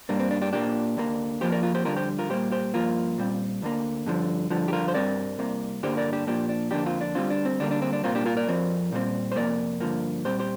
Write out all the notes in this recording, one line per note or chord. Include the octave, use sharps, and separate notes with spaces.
G2 G3 A#3 D4
C4
D4
D4 G4
A#2 A#3 D4 G4
D2 D3 A#3
F2 F3 A#3 G4 C5
A#4 D5
F4 A#4
G4 C5
F2 D3 G3 F4 A#4
G4 C5
F4 A#4
A#2 G3 A#3 G4 C5
G4 C5
G2 F3 A#3 F4 A#4
A#2 G3 C4
D2 D3 A#3
G2 D3 F3
G2 D3 F3
G4
F4 A#4
C5
G2 G3 C4 A#4 D5
C2 C3 A#3
G2 D3 G3 A#3 G4 C5
A#4 D5
D4 G4
A#2 F3 A#3 D4 G4
D4
F2 D3 A#3 D4 G4
C4 F4
D4
D2 D3 G3 C4 F4
D4
C4
D2 D3 G3 A#3 D4
D4
C4
D4
C2 A#2 A#3 C4 F4
D4 G4
F4 A#4
A#4 D5
F2 F3 C4
A#2 G3 C4
C5
F2 C3 A#3 A#4 D5
G2 D3 F3 A#3
A#2 G3 C4 G4 C5
G4 C5